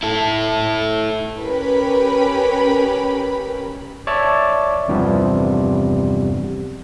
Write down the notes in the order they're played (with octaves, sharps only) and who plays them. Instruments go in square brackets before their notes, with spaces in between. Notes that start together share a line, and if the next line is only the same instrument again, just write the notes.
[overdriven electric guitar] E4 A4
[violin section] C#4 G4 A#4 B4 B5
[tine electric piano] C#5 D5 E5 A5
E2 G2 C3 F3 G3 B3